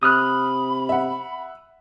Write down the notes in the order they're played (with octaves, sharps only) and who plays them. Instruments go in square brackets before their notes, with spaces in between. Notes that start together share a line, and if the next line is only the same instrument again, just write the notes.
[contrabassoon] C3 [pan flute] B5 [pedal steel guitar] D#6 F6 F#6
[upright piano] E5 F#5